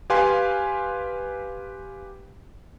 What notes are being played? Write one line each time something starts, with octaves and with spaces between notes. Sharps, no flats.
G4 B4 F5 G#5 C6